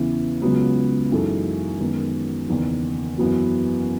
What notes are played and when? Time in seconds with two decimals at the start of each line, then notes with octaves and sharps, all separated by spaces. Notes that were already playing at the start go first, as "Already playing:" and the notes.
Already playing: E2 C#3 E3 B3
0.42 C#2 C#3 F#3 B3
1.12 F#2 E3 G#3 D#4 A4
1.80 F#2 D#3 G#3 B3 D#4
2.49 F#1 E2 D#3
3.18 F#2 E3 B3 F#4